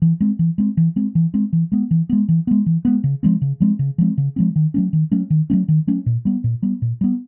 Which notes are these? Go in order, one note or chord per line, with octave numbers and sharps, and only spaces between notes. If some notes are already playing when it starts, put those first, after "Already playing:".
E3
G#3 C4
E3
G#3 C4
E3
G#3 C4
E3
G#3 C4
E3
G#3 B3
E3
G#3 B3
E3
G#3 B3
E3
G#3 B3
C#3
F3 G#3 C4
C#3
F3 G#3 C4
C#3
F3 G#3 C4
C#3
F3 G#3 C4
D#3
F#3 A3 C#4
D#3
F#3 A3 C#4
D#3
F#3 A3 C#4
D#3
F#3 A3 C#4
A#2
G3 B3
A#2
G3 B3
A#2
G3 B3